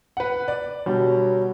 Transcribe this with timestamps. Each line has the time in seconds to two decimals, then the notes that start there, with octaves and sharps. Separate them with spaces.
0.17 B4 F#5
0.48 D5
0.86 B2 D3 F#3 G3